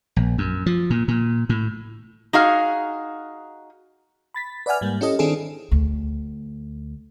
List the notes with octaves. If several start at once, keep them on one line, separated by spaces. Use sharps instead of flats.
A#1
F#2
F3
A#2
A#2
A2
D#4 F#4 G#4 F5
B5 A6 B6
B4 D5 E5 F#5 G#5 F6
G#2 G3 A#3
C#4 E4 G4 A4 D#5
D#3 C4 D4 E4 G#4 A4
D2